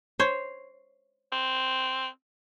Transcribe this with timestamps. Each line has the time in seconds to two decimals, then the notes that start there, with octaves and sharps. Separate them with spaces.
0.20 C5 C#5
1.32 C4